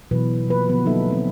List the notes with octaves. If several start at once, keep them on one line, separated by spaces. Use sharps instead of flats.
B2 E3 F#3 B4
F3 A#3 B4
D3 F3 F#3 B3
F#3 A#3 D#4 A4 E5
A3 C4